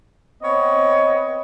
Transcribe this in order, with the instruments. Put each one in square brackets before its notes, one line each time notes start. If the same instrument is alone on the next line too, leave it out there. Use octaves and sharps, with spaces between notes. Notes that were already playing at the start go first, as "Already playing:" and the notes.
[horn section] B3 C4 C#5 D#5